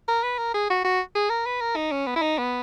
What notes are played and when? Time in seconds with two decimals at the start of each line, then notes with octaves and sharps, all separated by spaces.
0.08 A#4
0.23 B4
0.38 A#4
0.54 G#4
0.70 F#4
0.84 F#4
1.15 G#4
1.30 A#4
1.46 B4
1.61 A#4
1.76 D#4
1.92 C#4
2.07 B3
2.16 E4
2.22 D#4
2.38 B3